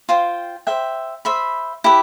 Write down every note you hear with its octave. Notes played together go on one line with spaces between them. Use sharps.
F4 C5 G5
C5 E5 G5
C5 E5 B5
E4 G4 B4